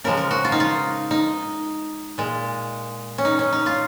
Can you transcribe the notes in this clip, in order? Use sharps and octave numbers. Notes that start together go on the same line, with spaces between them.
C#3 F3 G#3 A#4
A#4
F#4
F4
D#4
F4
D#4
A#2 G#3
C#4
D#4
C#4
D#4
F4